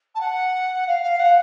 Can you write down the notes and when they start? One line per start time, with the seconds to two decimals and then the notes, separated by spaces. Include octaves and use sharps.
0.15 A5
0.20 F#5
0.87 F5
1.02 F5
1.19 F#5